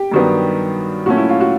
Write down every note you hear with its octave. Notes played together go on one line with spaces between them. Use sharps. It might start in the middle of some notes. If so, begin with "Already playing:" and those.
Already playing: G4
G2 D#3 F#3 B3 D4
A#2 F#3 A3 C#4 F#4
E4
F4
F#4